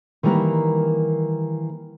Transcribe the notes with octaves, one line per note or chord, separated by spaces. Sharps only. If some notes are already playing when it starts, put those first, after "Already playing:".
D#3 E3 G3 A#3 A#4 B4